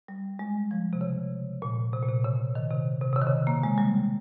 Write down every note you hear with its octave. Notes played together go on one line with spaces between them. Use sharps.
G3
G#3
F3
C3
C#3
A#2
C3
A#2
C3
C#3
D#3
C3
C3
C3
C#3
D#3
C#3
A#3
G#3
G3